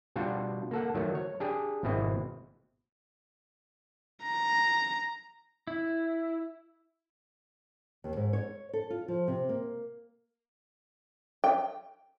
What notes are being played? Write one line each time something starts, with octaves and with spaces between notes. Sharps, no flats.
B2 G3 D4 F4 F#4
A#3 A4 F#5
D#3 F#3 A3
C#5
D4 G4 G#4
G#1 B2 C4 E4 D#5
A#5
E4
D#2
G#2
C#5
A4
F4
F3
C3
A#3
G5